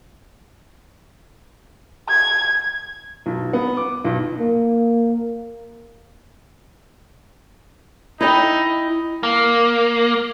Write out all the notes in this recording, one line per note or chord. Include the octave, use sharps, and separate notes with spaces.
G#6
B1
B3
D6
B1
A#3
D#4 E4 D#5 G5
A#3